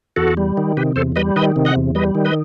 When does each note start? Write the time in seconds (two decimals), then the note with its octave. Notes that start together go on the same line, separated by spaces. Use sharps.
0.16 E2 F#4 A4
0.37 G3
0.57 D#3
0.77 C3 G4 B4
0.96 E2 A4 C5
1.16 G3 B4 D#5
1.36 D#3 B4 D#5
1.56 C3
1.65 D#5 F#5
1.76 E2
1.95 G3 B4 D#5
2.15 D#3
2.25 B4 D#5